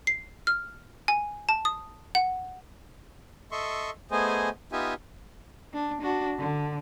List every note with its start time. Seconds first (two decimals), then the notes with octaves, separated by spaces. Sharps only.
0.07 C7
0.47 F6
1.08 G#5
1.49 A5
1.65 D#6
2.15 F#5
3.52 A4 D#5 E5 C6 C#6
4.11 A3 B3 G#4 C5 D#5 G#5
4.72 B3 D#4 F4 G4 E5 G#5
5.73 D4
6.02 D4 F#4
6.39 D3